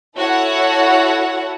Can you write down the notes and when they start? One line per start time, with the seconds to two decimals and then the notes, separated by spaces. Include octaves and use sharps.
0.17 E4 F#4 A4 C#5 F#5